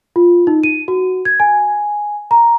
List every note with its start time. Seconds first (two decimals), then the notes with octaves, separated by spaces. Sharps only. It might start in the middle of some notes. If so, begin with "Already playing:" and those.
0.16 F4
0.47 D#4
0.63 D#7
0.88 F#4
1.25 G#6
1.40 G#5
2.31 A#5